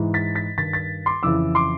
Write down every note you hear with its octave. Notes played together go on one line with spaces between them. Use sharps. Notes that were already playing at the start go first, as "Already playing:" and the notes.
Already playing: G#2 E3
A6 B6
A6 B6
G2 D#3 A6 B6
A6 B6
C6 D6
F2 C#3 E3 D6 E6
C6 D6